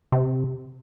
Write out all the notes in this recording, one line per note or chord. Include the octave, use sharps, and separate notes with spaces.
C3